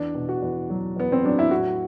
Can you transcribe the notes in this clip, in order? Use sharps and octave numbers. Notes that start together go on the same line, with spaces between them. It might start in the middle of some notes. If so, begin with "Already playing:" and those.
Already playing: E2 D4
B2
F#4
E2
F#3
E2 B3
C4
F#3 D4
E4
A2 F#4